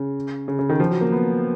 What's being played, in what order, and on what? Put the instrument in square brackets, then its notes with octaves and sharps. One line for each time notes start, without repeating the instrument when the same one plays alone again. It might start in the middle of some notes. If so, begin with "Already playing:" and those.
Already playing: [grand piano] C#3
C#3
C#3
D#3
F3
F#3
A#3
B3